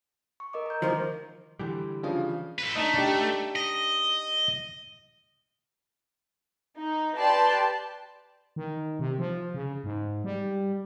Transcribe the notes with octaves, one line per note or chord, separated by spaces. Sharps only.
C#6
A#4 D#5 D6
A#5 G6
C#2 D#3 F3 D#5 A#5
D3 E3 G3
C#3 F3 D4 F4
A4 B4
A3 D4 D#4 D#5
D4 D#4 G4
D#5
D#4
G4 B4 D5 A5 C6
D#3
C3
F3
C#3
G#2
G3